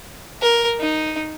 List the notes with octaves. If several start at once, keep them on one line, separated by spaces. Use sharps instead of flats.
A#4
D#4